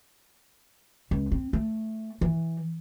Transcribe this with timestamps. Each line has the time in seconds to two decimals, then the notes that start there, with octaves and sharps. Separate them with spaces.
1.11 C#2
1.32 C4
1.53 A3
2.21 E3